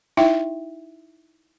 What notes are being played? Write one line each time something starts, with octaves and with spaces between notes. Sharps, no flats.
D#4 E4 E5 G5